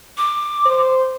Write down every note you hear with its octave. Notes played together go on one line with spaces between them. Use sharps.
D6
C5